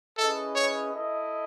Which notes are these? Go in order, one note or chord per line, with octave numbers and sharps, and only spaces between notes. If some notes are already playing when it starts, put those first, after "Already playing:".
C#4 E4 G#4 A4 B4 D#5
C#5
E4 A4 D#5